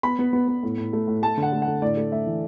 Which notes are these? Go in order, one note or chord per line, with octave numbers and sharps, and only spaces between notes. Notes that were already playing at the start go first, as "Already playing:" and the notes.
B3 B5
B3
B3
B3
A2
A2
A3
A2
A3 A5
D3
F#5
A3
F#5
D3
A2 D5
A3
A2 E5
E3